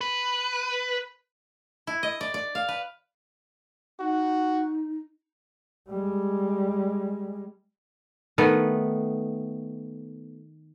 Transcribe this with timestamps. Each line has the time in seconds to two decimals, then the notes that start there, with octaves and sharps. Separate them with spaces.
0.01 B4
1.87 E4
2.03 D#5
2.21 D5
2.34 D5
2.55 F5
2.69 B4
4.00 D#4 F#4
5.88 G3 G#3
8.38 D#3 A3 B3